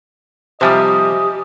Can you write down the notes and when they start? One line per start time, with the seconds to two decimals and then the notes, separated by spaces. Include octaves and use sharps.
0.61 C3 F3 G3 G4 C5 D#5 E5 G#5